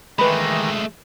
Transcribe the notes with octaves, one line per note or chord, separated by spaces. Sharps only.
D#3 E3 G#3 A3 B4 B5 A#6